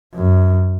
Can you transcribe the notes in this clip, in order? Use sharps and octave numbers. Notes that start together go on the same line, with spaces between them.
F#2